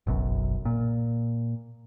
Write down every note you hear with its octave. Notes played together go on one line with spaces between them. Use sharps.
F#1 B1 F#2
A#2